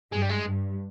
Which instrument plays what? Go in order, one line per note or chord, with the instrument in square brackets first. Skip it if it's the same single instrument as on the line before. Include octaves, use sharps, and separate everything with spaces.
[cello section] G2 [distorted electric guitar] G#3
[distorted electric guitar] G3
G#3
[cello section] G2